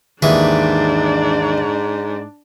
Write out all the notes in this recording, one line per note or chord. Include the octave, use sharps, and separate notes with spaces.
D#2 G#2 E3 D4 G#4 D5